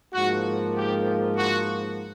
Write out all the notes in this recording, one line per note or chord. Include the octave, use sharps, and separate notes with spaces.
G#2 F3 A#3 F#4
G4
F#4